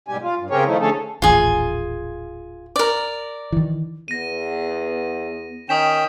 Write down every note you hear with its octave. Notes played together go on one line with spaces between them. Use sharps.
G#2 B2 G3 G4 G#5
F4
G2
C#3 C4 G4 G#4 A#4 C#5
D#3 F3 A3 D#4 E4
D3 A3 C#4 G#4 A4
D#1 A1 F4 G#4
A#4 D5
D#3 E3
E2 B3 A#6 D#7
D#3 C#4 G5 D#6 B6 E7